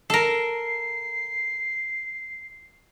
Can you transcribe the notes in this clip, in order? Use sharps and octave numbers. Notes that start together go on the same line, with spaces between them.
A4 A#4 C7